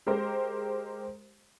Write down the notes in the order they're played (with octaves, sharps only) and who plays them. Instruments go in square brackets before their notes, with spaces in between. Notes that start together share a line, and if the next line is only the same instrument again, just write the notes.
[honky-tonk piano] G#3 G4 A#4 C5